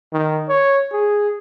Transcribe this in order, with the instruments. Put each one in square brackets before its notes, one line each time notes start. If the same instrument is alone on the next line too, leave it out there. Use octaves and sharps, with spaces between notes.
[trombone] D#3
C#5
G#4